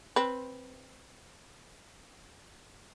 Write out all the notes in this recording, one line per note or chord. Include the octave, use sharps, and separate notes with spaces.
C4 B4